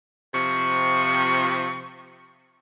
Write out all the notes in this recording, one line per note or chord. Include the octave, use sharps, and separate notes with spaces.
C3 F3 C#6